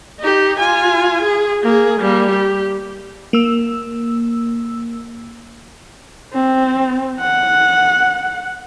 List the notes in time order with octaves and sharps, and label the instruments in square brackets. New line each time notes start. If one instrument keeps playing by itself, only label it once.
[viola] D#4 G4
F4 G#5
G#4
A#3 G#4
G3 A#3
G4
[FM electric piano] A#3 E6
[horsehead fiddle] C4
F#5